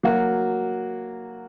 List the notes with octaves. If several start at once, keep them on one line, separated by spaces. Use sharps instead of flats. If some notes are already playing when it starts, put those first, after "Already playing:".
F#3 A#3 F#4